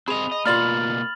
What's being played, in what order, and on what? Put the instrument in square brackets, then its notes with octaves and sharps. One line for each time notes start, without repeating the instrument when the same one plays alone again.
[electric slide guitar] C4 D#5 [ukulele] G#4 [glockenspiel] B5 F7
[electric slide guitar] D#5
[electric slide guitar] B2 A#3 [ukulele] F4 D5 B5 [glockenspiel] F6 A6 F#7